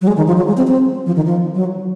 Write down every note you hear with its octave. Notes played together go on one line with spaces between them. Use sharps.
F#3
G#3
D#3
F3
F#3
G#3
C4
C4
F3
D#3
F3
F#3